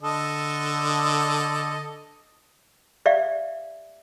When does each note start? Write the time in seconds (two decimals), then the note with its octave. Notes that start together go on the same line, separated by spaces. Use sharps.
0.02 D3 A4 D#5
3.06 G4 D5 E5 F5